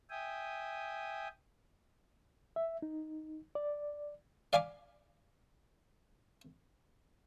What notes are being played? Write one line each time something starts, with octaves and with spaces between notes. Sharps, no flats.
E5 G5 G#5 D#6
E5
D#4
D5
D5 F5 G#5 B5 D6